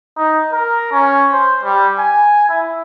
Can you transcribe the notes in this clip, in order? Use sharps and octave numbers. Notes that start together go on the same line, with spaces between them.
D#4
A#4
C#4
C5
G3
G#5
E4